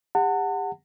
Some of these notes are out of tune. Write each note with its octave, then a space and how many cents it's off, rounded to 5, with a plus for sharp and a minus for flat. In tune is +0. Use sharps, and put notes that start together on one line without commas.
G4 +40 F#5 +0 A5 +40